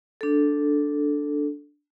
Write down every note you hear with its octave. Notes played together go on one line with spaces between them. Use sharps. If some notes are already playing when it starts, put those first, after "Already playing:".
D4 A4